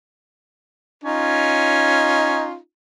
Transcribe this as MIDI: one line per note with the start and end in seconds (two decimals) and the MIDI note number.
1.04 2.57 61
1.04 2.57 63
1.04 2.57 65